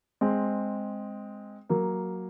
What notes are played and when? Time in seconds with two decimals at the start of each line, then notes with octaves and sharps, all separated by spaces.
0.21 G#3 C4
1.69 F#3 A#3